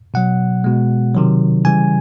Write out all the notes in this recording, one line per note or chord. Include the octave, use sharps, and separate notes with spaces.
B2 F#3 F#5
B2 G#3
C3 D#3 F#3
C#3 E3 G3 G#5